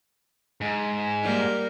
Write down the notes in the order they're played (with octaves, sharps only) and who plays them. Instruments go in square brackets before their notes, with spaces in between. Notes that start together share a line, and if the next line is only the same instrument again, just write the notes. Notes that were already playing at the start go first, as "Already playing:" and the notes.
[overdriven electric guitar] G#2
[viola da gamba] G3 A#3 A#4